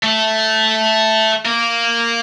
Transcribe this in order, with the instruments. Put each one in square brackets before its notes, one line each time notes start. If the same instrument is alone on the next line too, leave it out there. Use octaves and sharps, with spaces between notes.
[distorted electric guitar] A3
A#3